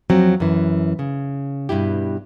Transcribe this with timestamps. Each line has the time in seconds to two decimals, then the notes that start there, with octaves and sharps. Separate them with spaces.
0.10 F2 F3 F#3 C4
0.40 F#2 E3
0.99 C#3
1.69 G2 B2 E4 G4